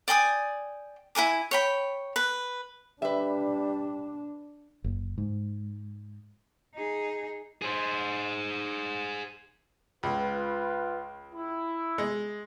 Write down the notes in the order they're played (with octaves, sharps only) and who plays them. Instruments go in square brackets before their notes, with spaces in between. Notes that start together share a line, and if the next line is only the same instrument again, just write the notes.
[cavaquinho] D5 G5 G#5 D#6
E4 A#4 G#5 D6
C#5 G5 B5
B4
[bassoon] G3 [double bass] D4 [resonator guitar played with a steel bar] B4 E5
[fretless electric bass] F#1
G#2
[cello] D#4 G#4
[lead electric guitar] G#4 C5
[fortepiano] C#2 [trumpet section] F4 B4
[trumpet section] E4
[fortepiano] G#3